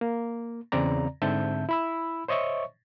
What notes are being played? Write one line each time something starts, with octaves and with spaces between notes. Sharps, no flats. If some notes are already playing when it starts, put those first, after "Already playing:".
A#3
E2 C#3 C4 D5 A#5
G#2 D3 C4 E5 A5 G6
E4 B5 E6
C5 C#5 D#5 E5 C#6